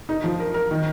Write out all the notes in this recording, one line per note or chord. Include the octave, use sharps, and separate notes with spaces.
D#4
F3
A#4
A#4
D#3